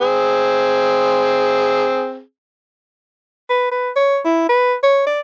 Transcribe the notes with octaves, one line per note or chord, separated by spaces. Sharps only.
C4 G#4
B4
B4
C#5
E4
B4
C#5
D5